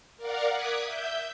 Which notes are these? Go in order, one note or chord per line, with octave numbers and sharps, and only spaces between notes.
A#4 D5 F5 F#5
D6 D#6 F#6 G#6 B6
E5 G6